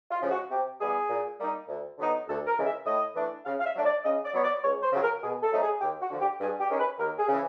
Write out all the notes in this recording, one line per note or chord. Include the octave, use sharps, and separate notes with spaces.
F4
C#3 F3 G#3
F#4
C3 G4
E3 G3 B3 G#4
A#2
G3 A#3 D#4
D2
D3 F#3 B3 D#4
D2 A4
A#4
C#3 E3 G#3
E5
A2 D#5
E3 A3 D4
C#3 F5
F5
E5
F#3 A3 D4
D5
C#3 D#5
D5
F#3 B3 C#5
D5
C#2 C#5
C5
C#3 F#3
A#4
B2 G#4
A4
F#3 A3 C4 D#4
G#4
D#2 G4
F#4
D3 F3
G4
G2 G#4
G4
D#3 G#3 C#4
B4
D#2 A#4
G#4
C#3 E3